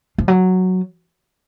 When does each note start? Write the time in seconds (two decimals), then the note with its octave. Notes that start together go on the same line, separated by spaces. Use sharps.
0.18 F3
0.28 F#3